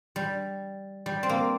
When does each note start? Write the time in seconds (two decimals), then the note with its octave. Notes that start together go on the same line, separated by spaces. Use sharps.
0.16 G3
1.06 G3
1.23 C4
1.29 A#3